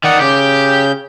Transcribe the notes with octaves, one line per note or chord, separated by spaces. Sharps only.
D#3 D5 F#5 D#6
C#3 G4 G6